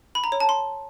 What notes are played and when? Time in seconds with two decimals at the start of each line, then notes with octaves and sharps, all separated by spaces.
0.15 B5
0.24 A#5
0.32 C#5
0.40 A5
0.49 C6